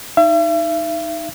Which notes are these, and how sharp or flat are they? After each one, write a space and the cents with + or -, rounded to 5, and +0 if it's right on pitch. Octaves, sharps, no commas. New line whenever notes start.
D#4 +0 E5 +40